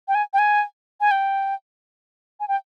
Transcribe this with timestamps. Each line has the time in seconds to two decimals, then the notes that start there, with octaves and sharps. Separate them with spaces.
0.08 G5
0.15 G#5
0.34 G5
0.39 G#5
1.01 G#5
1.11 G5
2.40 G#5
2.48 G5